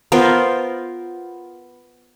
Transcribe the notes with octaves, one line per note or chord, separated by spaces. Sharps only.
B3 F4 A#4 C5